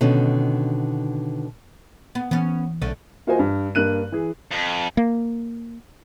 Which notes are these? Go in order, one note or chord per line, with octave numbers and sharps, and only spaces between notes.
B2 D3 D#3 C#4
B3
E3 B3 C#4
B1 D3 A3 C#4
A#3 F4 F#4 C5 D#5 G#5
G2
G2 A#3 F#6 D#7
E3 G#4
F2
A#3